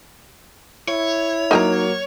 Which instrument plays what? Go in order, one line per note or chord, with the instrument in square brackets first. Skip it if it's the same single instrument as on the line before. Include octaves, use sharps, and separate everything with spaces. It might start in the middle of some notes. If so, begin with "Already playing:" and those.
[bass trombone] E4 [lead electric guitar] C#5
[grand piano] F#3 A#3 [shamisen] D#4 G#5 A#5